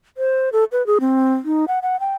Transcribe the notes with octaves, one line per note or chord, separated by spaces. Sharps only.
C5
A4
B4
G#4
C4
D#4
F#5
F#5
G5